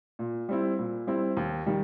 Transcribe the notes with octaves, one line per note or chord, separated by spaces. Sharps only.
A#2
G3 C4 E4
A#2
G3 C4 E4
D#2
D#3 G3